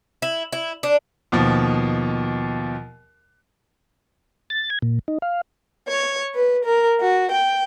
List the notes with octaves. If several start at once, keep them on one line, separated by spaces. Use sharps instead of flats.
E4
E4
D4
D#2 B2 F3
A6
G#6
A#2
D#4
F5
C#5
B4
A#4
F#4
G5